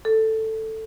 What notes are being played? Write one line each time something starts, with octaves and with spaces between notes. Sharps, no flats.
A4